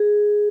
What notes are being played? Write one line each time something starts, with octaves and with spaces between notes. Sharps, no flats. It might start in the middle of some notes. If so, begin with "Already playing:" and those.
Already playing: G#4